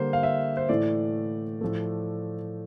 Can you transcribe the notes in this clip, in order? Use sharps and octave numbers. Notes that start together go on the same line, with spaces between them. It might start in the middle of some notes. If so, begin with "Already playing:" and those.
Already playing: D3 G3 A#3 C5
F5
E5
C5
A2 E3 A3 D5
A2 F3 A3